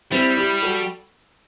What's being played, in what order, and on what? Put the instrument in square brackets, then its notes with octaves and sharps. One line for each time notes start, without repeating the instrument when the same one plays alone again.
[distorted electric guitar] G3 [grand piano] C4 E4
[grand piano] E4 G4
F#4 A4